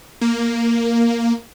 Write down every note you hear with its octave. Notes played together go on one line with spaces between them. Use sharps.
A#3